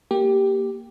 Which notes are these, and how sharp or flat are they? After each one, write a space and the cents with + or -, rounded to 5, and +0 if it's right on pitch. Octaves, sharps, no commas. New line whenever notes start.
A#3 +0 G4 +0